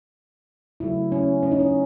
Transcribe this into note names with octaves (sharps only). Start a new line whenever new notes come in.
C#3 F#3 A3 E4
C#4
C#4
D#4
C#4